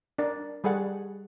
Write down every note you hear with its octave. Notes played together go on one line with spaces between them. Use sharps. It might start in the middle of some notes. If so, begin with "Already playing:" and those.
D4 A#4 D5
G3 G#4 A4 D5 F#5